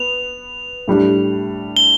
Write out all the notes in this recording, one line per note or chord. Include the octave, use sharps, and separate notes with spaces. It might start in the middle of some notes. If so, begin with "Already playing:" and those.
Already playing: B3 F7
A2 G3 D4 G4
G7